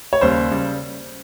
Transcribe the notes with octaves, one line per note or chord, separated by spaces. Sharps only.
C#5
D#2 C#3 G3 C5
C#3 G3